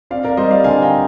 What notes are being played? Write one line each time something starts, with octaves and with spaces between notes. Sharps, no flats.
C4 D5 F5
A#4 D5
G3 C5 D#5
D5 F5
D3 F5 G#5
G5 A#5